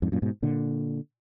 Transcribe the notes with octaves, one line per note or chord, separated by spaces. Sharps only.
F2 G#2
F#2 A#2
G#2 B2
A#2 D3